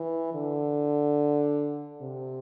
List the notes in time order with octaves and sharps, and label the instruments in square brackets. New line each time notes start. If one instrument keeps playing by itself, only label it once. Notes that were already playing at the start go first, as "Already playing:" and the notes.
Already playing: [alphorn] E3
D3
C3